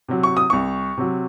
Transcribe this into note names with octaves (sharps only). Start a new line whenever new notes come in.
C3 F#3
C#6
D#6
C2 C#6
C3 F#3